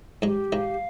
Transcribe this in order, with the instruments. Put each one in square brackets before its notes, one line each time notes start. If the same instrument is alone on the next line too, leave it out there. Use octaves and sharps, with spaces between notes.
[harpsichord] G#2 G#3 [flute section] G4
[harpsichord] G#2 G#3 [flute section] F5